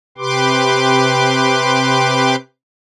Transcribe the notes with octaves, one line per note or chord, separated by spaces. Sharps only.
C3 G4 B4 C6 D6